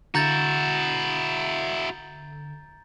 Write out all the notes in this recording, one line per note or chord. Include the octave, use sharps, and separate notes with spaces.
D3 E4 F#4 A#5 G6 A6